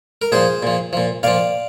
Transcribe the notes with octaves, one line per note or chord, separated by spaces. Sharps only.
A#4
A#2 F3 G#4 C5
A#2 F3
A#2 F3
A#2 F3 D5 F5